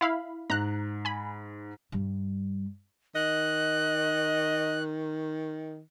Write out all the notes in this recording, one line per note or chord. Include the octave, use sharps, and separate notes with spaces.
E4 F5 B5
G#2 A#5 F#6
G#5 B5
G2 G3
D#3 D#5 F#6